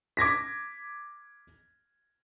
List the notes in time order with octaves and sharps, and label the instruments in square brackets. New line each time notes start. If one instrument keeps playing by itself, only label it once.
[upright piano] D6 G#6 A#6 B6